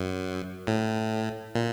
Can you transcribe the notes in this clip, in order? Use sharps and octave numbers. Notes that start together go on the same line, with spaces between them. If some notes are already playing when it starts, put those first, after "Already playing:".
Already playing: F#2
A2
A#2